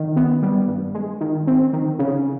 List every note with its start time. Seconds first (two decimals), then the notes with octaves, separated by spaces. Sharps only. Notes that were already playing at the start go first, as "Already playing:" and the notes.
Already playing: D#3
0.16 B3
0.42 G3
0.68 G2
0.94 G#3
1.21 D#3
1.47 C4
1.73 D#3
1.99 C#3